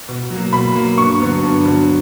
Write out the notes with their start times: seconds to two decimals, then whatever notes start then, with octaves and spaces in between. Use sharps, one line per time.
0.09 B2
0.30 F#3 A#3
0.52 B2 B5
0.75 F#3 A#3
0.97 G2 C#6
1.20 D3 F#3 B3
1.43 G2
1.65 D3 F#3 B3